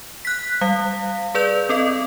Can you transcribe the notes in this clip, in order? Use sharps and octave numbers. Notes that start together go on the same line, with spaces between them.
F#6 B6
G3 F5
G#4 B4 D5 G6 F7
C4 A4 D#5